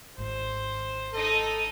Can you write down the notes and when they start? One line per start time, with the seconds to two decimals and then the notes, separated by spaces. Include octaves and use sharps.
0.18 G#1 D#3 C5
1.14 D#4 A4 D#5